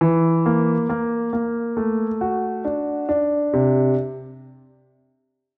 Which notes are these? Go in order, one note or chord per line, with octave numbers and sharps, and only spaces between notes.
E3
A#3
A#3
A#3
A3
F#4
D4
D4
C3